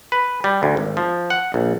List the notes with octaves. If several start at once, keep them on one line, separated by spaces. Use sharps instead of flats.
B4
G3
D2
G#1
F3
F#5
A#1